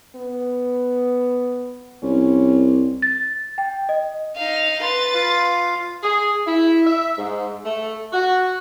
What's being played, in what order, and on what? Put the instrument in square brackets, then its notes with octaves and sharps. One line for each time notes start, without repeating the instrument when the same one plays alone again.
[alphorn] B3
[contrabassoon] C2 [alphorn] C#4
[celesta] A6
G5
D#5
[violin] D#4 F5
[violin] B4 A6 [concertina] C6
[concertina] F4 F5
[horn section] G#4
E4
E5
G#2
A3
F#4